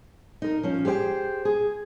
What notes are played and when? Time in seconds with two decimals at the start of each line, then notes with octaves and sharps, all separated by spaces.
0.42 D#4 A#4
0.63 F3 C#4
0.85 G4 G#4 C5 D5 G5
1.45 G#4